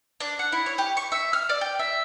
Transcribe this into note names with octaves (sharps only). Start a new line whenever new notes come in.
D4
F#5
E4
C#5
G4
C#6
E5
F6
D5
G5
E5